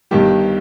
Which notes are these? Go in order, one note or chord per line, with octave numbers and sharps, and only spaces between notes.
G1 G2 D#3 G3 G4